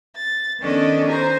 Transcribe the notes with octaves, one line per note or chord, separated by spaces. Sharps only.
A6
D#3 B3 C#4 D4 A4 D#5
C5 G#5 A#5